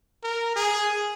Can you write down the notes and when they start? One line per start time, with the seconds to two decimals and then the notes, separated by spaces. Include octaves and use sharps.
0.23 A#4
0.56 G#4